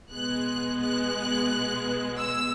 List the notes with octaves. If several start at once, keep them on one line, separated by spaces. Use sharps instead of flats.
B2 G#3 B3 F#6
F#6
E6